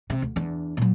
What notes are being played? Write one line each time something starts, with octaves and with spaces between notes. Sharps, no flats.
C3
D2
E2 D4
A#2 F#3